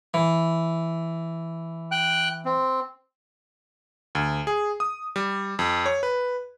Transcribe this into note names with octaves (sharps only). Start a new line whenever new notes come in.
E3
G5 F#6
C4
D2
G#4
D#6
G3
F2
C#5
B4